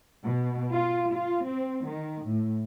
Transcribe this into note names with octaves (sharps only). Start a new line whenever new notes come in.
B2
F4
F4
C4
D#3
A2